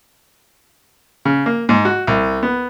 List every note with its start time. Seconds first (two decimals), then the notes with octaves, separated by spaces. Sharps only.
1.25 C#3
1.46 A#3
1.69 G#2
1.85 F#4
2.07 C2
2.43 B3